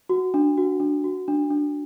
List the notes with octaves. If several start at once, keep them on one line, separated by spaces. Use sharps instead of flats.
F#4
D4
F#4
D4
F#4
D4
D4